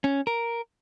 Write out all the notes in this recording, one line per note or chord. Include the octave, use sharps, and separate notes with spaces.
C#4
A#4